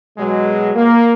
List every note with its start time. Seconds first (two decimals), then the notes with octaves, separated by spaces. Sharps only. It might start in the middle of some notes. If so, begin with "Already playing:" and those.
0.18 B2 F#3 G#3
0.76 A#3